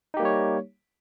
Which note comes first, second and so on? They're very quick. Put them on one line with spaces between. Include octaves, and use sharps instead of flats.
D#4 G4 A#3 G3 C#5